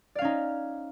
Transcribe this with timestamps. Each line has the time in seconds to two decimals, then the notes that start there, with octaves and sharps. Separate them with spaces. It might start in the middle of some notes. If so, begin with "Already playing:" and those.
0.15 D5
0.18 F5
0.21 C#4
0.25 D#4